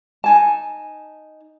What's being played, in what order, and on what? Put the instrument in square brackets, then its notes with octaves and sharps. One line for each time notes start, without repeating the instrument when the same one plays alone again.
[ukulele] D#4 G#5 A5